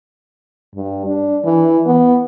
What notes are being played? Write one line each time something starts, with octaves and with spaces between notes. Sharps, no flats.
G2
D4
E3
B3